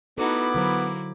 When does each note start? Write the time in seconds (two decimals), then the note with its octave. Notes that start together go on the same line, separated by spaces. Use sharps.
0.18 B3 D#4 E4 F#4 A4 D6
0.54 D3 F#3 A#3 F#4 C5